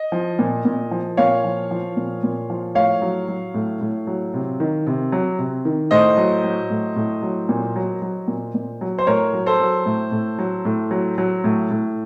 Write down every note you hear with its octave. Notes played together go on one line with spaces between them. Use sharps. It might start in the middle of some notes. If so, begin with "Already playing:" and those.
Already playing: D#5
F3
A#2
A#2
F3
A#2 C#5 F5
F3
F3
A#2
A#2
F3
A2 C#5 F5
F#3
F#3
A2
A2
F#3
C3
D#3
C3
F#3
C3
D#3
A2 C5 D#5
F#3
F#3
A2
A2
F#3
A#2
F#3
F#3
A#2
A#2
F#3
C5
A2 A#4 C#5
F#3
A4 C5
F#3
A2
A2
F#3
A2
F#3
F#3
A2
A2